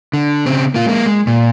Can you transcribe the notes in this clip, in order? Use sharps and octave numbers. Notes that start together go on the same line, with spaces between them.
D3
C#3 C4
A#3 F4
G#3 A#3
G#3
A#2